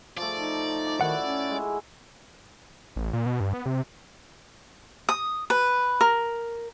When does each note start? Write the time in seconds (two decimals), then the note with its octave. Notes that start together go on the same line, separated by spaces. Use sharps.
0.17 F3 A3 D5
0.34 D#4
0.87 D6
1.01 D#3 E4 F#4 E5 F#5
1.20 C#4 E5
1.51 G#3
2.96 A1
3.13 A#2
3.26 B2
3.40 G2
3.53 B3
3.66 C3
5.09 D#6
5.50 B4
6.01 A#4